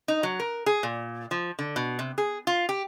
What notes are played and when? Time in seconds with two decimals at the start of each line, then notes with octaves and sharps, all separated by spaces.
0.08 D#4
0.23 F#3
0.40 A#4
0.66 G#4
0.83 A#2
1.31 F3
1.59 D3
1.76 B2
1.99 C3
2.18 G#4
2.47 F4
2.69 G4